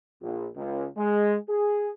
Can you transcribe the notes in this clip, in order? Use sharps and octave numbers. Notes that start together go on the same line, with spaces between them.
A#1
C#2
G#3
G#4